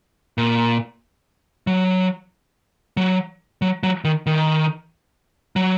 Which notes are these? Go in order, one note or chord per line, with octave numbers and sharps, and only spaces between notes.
A#2
F#3
F#3
F#3
F#3
D#3
D#3
F#3